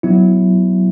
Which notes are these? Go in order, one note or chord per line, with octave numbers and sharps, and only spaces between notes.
F#3 B3 E4